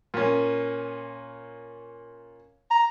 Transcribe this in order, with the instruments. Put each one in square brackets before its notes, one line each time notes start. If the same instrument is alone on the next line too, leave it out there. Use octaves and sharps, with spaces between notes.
[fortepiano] A#2 C#4
[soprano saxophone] A#5